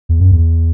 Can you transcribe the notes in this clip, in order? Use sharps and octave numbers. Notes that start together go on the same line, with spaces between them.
E2
F#2
E2